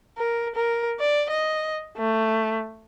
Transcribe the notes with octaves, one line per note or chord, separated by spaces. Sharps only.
A#4
A#4
D5
D#5
A3